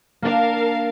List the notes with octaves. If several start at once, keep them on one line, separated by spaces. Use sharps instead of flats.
A#3 D4 A#4 F5 A5